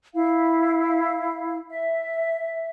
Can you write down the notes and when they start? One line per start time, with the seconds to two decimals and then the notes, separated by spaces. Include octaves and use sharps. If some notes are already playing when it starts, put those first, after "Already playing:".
0.15 E4 F5
1.69 E5